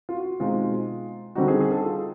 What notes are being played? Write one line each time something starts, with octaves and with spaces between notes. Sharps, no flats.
F4
F#4
B2 G#3 C4 D#4 F4
D3 G3 C4 D#4 F#4
G#4
G#4
A4
F4